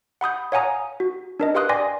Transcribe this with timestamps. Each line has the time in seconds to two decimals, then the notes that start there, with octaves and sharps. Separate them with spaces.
0.21 F#5 B5 D#6 G6
0.52 C#5 F5 F#5 G#5 A#5 D#6
1.00 F#4
1.40 D4 A#4 D#5
1.55 G4 B4 F5 C6 D#6 F#6
1.69 D5 G5 G#5 C6 D6 A#6